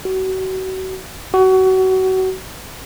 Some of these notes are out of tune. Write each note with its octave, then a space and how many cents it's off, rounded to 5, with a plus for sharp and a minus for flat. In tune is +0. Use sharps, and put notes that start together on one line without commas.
F#4 +30
F#4 +25